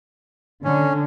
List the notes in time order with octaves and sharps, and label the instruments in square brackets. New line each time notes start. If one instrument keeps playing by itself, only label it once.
[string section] D3 [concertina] C#4